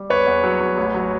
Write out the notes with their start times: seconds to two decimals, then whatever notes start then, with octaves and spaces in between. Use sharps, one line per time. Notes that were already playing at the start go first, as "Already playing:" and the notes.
Already playing: G3
0.10 E2 B4 C#5
0.27 E2
0.44 F#3
0.60 F#3
0.77 A1
0.94 F#3